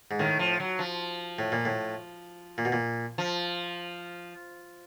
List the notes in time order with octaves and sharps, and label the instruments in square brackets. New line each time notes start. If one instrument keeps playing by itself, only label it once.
[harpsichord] G#2
[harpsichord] A2 [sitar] D#3
[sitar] F3
F#3
F3
[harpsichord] A2
A#2
A2
A#2
B2
A#2
[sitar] F3